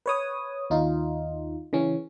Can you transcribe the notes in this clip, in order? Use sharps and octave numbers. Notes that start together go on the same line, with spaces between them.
B4 C#5 D#6
D#2 D#4 F4
C#3 E3 C#4